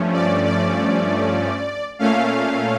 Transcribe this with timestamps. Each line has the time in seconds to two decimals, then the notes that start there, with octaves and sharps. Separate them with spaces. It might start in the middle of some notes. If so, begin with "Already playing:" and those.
Already playing: G2 F3 A3 C#4
0.13 D5
0.44 D5
1.99 A#2 A3 C#4 F5